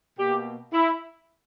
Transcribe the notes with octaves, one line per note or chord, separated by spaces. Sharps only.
B2 A#3 G4
E4